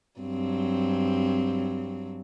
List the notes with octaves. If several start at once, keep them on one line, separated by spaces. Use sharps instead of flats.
G2 F#3 C4